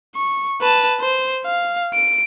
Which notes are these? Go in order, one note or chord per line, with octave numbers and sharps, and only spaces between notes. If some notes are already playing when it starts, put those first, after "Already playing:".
C#6
B4 A5
C5
F5
D7